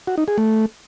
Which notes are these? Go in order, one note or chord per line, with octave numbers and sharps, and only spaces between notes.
F#4
D#4
G#4
A3